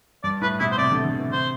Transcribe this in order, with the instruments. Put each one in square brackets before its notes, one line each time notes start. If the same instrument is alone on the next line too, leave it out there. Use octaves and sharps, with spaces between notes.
[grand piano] G2 [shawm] D5
[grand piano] A2 [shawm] B4
[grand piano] B2 [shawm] E4
[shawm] C5
[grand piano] C3 [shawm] D5
[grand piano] D3
D3
E3
[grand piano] C3 [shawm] C5